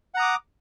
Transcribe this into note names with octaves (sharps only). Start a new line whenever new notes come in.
F#5 A#5 D6 D#6